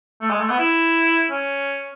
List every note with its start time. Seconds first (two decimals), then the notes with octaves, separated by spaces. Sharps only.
0.21 A3
0.30 G#3
0.40 A3
0.49 B3
0.58 E4
1.31 C#4